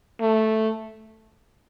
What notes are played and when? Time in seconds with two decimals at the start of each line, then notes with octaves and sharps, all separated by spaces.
0.20 A3